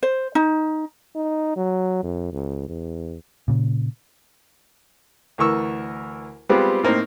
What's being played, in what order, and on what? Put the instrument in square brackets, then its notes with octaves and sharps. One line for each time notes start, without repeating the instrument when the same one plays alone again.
[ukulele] C5
D#4
[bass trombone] D#4
F#3
F2
C#2
E2
[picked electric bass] A#2 C#3
[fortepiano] D2 E3 A#4 C#6 E6
G3 G#3 B3 C4 F4 G4
A2 A#3 C4 D#4